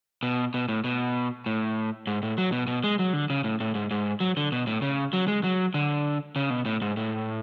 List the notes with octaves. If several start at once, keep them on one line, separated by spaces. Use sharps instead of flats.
B2
B2
A2
B2
A2
G#2
A2
F#3
B2
B2
G#3
F#3
D3
C#3
A2
A2
G#2
G#2
F#3
D3
B2
A2
C#3
F#3
G#3
F#3
D3
C#3
B2
A2
G#2
A2